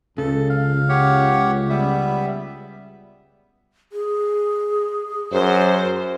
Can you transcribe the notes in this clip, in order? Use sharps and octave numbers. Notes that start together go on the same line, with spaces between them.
C#2 C#3 A4
F5
G4 C#5 F#5
G3 B3 E5
G#4
F#2 C5